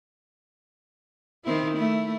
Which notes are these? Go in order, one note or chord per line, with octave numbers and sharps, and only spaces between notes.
D#3 C4 E4
A3 E4